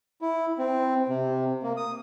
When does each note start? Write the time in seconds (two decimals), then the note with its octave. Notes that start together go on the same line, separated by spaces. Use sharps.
0.21 E4
0.58 C4
1.09 C3
1.63 A#3
1.77 D#6